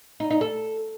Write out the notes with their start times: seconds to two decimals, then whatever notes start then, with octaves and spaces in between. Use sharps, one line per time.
0.20 D#4
0.31 D#4
0.41 A4